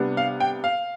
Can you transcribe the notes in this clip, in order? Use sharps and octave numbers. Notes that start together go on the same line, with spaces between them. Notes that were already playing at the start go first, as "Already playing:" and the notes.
Already playing: C3 G3 B3 D4
F5
G5
F5